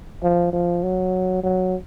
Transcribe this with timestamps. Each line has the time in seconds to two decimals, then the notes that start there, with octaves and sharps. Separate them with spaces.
0.23 F3
0.53 F3
0.83 F#3
1.44 F#3